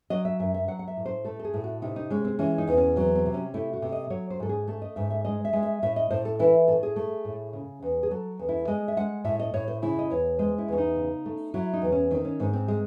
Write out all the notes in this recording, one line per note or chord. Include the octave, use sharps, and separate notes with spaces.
F#3 D#5
E5
F#2 E5
E5
F#3 F#5
F#5
E5
A2
C5
A3 A4
A4
G#4
A2
F#4
C3 D#4
D#4
G#3 C#4
C4
E3 C#4
D#4
E2
C#4
F#3 C4
C4
C3
C#4
A3 E4
F#4
C3
D#5
F#3 C#5
C5
G#2 A4
G#4
A3 A4
D#5
G#2 E5
E5
G#3 D#5
E5
G#3
E5
A2 E5
D#5
A2 C5
A4
E3 E4
A2 A4
G#4
A3
A2
C#3
E2
G#4
F#3 A4
E2
E4
G#3 D#5
E5
G#3 F#5
A2 E5
D#5
A2 C#5
C5
C#3 E4
D#5
E2 C#5
G#3 C5
E4
E2 C#4
D#4
C#3
A3
F#3 E4
D#4
E2
C#4
D#3 C4
C#4
G#2 C4
C4
G#3